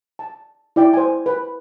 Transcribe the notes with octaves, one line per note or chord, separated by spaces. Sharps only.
A5
E4 D5 G5
C5 G#5
B4